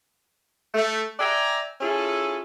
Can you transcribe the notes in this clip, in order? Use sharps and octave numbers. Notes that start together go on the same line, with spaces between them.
A3
D5 E5 G5 G#5 A#5
C#4 E4 F4 G#4 A4